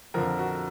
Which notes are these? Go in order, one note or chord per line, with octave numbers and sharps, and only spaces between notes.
F2 D3 F3 A#4
F#4